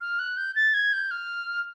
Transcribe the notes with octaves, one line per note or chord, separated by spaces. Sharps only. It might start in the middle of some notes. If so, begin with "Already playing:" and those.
F6
F#6
G6
A6
G#6
G6
F6